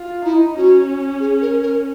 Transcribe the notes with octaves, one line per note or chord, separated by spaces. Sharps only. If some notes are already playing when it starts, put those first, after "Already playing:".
Already playing: F4
D#4 E4
C#4 F#4
G#4
A#4
A#4